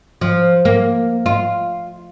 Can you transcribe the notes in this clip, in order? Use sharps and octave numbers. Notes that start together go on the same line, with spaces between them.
F3
A#3
F4